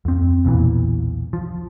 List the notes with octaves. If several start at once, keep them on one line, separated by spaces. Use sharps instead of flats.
F2 C4
B1 E2 A#2 E3
F3